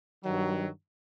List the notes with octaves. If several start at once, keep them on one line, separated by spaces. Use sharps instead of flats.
G2 D#3 F#3